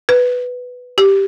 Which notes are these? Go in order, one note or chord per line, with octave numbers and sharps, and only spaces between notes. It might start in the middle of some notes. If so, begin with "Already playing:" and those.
B4
G4